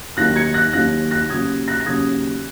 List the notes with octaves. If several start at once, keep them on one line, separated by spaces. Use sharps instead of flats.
D#2 D#3 F#3 F#6 A#6
G#6 C#7
F#6 A#6
D#2 D#3 F#3 F#6 A#6
F#6 A#6
D#2 C#3 F#3 D#6 G#6
F#6 A#6
A#6
D#2 C#3 F#3 D#6 G#6